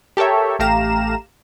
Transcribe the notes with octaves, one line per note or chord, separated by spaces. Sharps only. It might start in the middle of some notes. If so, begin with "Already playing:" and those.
G4 A4 A#4 C#5 E5
A1 A3 G4 F5 A#5 E7